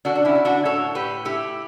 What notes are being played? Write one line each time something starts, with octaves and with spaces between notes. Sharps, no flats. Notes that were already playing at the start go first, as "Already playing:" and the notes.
D3 D4 F#4
D4
C#4 E4
D3
D4 F#4
A2 A4 C#5
A2 G4 B4
A3 E4 G4